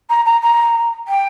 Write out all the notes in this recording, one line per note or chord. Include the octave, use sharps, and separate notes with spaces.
A#5
A#5
A#5
G5